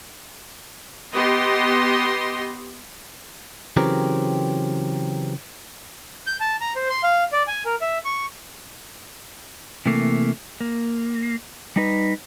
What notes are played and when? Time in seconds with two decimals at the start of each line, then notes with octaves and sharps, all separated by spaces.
1.13 B3 G4 D#5 C6
3.77 C#3 E3 F#3 C4 G4 A#4
6.27 G6
6.40 A5
6.61 A#5
6.76 C5
6.90 C6
7.03 F5
7.33 D5
7.48 G#5
7.66 A#4
7.81 E5
8.05 C#6
9.86 C3 E3 A3 A#3
10.61 A#3
11.76 G3 D#4 B4